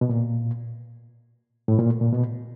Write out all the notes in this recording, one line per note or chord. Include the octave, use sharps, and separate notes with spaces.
B2
A#2
A2
A#2
A#2
B2